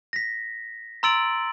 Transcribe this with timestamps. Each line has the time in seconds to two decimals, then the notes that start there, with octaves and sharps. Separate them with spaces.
0.13 A#6 B6
1.03 A#5 C6 E6 A6 D7 F#7